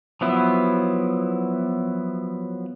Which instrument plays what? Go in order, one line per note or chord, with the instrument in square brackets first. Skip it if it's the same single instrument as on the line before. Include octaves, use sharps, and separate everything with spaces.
[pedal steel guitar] F3 F#3 B3 E4